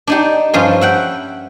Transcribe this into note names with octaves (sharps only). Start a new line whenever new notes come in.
D4 D#4 G4
G2 F3 C#4 E5 C6
E5 F#5 G5